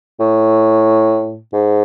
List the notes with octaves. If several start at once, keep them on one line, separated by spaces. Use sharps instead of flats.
A2
G#2